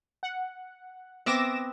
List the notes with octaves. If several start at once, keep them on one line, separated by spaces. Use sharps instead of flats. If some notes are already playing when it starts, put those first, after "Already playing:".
F#5
B3 C4 E5 D6 A#6 E7